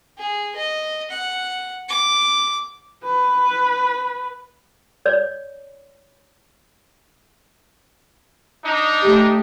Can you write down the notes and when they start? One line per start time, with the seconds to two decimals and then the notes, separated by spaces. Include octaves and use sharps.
0.18 G#4
0.56 D#5
1.11 F#5
1.89 D6
3.04 B4
5.06 C#5 D5
8.65 D4 D#4
9.03 A3 G4